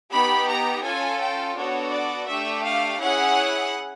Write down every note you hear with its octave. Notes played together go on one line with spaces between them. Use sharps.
B3 D#4 G4 B5
A#5
C#4 F4 A4 G#5
G5
B3 D4 F#4 A4 C#5
D5
A3 D4 G4 E5
F5
C#4 E4 G#4 F#5